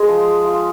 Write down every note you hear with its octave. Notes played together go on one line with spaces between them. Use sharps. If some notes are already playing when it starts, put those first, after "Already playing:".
Already playing: G#3 G#4
F3
F4